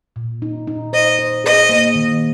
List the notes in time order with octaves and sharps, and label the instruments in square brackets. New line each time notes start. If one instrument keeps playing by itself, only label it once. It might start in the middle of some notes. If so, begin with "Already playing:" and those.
[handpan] A#2
D#4
D#4
[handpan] C5 [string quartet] D#5
[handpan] C5
[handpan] G#4 [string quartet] D#5
[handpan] A#3
D#3